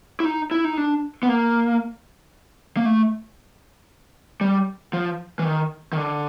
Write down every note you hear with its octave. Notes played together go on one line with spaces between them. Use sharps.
E4
D#4
E4
D#4
D4
B3
A#3
A#3
A3
G3
F3
E3
D#3
D#3
D3